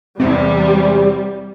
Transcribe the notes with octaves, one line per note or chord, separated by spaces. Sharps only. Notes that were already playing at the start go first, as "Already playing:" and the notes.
E2 C3 G3 C4